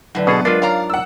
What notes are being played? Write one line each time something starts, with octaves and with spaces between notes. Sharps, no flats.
A2 D3 F#3 B4 D5
B2 B3 G#4 A4
G#3 D4 F4 A#4 B4 D5
G#2 C#5 D5 F5 A#5
F#5 E6